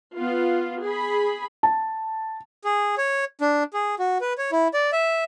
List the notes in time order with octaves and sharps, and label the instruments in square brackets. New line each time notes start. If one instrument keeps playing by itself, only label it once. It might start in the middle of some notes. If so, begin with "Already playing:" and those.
[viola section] B3 F4
G#4 B5
[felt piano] A5
[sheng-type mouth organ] G#4
C#5
D4
G#4
F#4
B4
C#5
E4
D5
E5